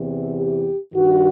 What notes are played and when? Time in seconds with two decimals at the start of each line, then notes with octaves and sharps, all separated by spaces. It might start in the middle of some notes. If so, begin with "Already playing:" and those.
Already playing: E2 C3 E3
0.36 G4
0.94 G2 D#3 F#4